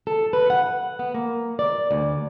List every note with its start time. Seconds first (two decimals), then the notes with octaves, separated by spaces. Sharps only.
0.07 A4
0.33 B4
0.50 F#5
0.99 B3
1.14 A#3
1.59 D5
1.91 D2